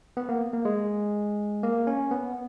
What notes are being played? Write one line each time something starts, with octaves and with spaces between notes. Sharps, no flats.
B3
A#3
A#3
G#3
A#3
C#4
B3